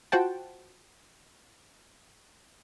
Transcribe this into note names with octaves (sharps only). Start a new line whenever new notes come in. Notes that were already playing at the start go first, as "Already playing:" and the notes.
F4 F#4 C5 F#5 G5 A5